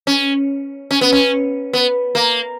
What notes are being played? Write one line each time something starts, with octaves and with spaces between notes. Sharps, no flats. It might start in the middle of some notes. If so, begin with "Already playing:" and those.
C#4
C#4
B3
C#4
B3
A#3